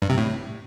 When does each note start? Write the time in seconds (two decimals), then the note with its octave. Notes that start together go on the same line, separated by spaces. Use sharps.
0.02 G2
0.10 C3
0.18 A2